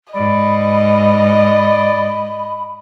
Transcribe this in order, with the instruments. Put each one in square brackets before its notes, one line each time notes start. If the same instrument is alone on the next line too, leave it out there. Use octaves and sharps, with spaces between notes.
[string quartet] G#2 [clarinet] D5 [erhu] D#5 [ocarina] B5